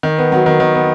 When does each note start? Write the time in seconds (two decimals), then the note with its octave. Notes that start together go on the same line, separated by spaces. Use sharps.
0.03 D#3
0.18 B3
0.32 F#3
0.46 D#3
0.60 D#3
0.75 B3